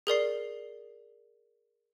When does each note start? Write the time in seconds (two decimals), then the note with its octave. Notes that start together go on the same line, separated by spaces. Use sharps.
0.07 G#4 A#4 D5 C7